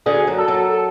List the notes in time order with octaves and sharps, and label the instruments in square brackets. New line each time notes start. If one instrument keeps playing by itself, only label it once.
[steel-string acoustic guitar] D2 D3 [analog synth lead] G#4
[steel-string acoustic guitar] F#2 F#3
[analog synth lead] A4
[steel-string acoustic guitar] F#2 F#3
[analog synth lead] A4